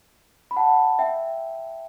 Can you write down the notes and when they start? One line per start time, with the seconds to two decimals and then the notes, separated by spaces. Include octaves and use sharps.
0.51 B5
0.56 F#5 A5
0.99 E5 G5